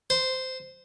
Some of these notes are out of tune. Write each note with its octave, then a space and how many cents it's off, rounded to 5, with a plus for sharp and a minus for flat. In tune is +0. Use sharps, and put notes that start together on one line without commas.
C5 -10